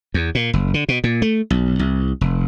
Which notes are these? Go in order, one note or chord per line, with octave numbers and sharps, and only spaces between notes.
E2
A#2
F#1
D3
B2
A#2
A3
B1
C2
F1